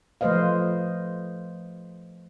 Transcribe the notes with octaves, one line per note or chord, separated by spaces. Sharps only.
F3 A3 B4 C5 D#5 F5